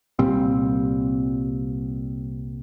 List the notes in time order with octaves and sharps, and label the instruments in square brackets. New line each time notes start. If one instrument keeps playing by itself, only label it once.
[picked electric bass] C2 A#2 G3 C4